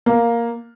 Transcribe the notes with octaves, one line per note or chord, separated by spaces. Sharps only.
A#3